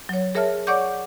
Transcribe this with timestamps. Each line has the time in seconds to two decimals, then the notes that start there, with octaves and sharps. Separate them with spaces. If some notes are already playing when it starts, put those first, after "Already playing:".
0.09 F#3 C#5
0.35 G#4 A#4 C#5 E5 A5 F6
0.67 C#5 D5 F#5 C#6 D6 G6